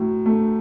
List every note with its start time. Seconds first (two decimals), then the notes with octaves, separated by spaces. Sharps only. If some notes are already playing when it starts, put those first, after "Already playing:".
Already playing: A2 F#3
0.26 A3